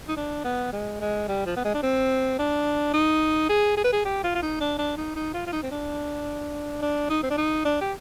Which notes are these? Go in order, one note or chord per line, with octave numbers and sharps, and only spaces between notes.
D#4
D4
B3
G#3
G#3
G3
F3
B3
G#3
D4
C4
D4
D#4
G#4
G#4
B4
G#4
G4
F4
F4
D#4
D4
D4
D#4
D#4
F4
F4
D#4
C4
D4
D4
D#4
C4
D4
D#4
D4
G4